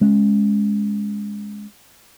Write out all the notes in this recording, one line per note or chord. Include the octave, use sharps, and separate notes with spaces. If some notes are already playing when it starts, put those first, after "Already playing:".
G#3 C#4